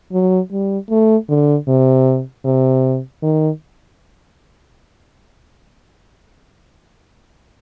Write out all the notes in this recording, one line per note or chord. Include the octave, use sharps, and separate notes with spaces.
F#3
G3
A3
D3
C3
C3
D#3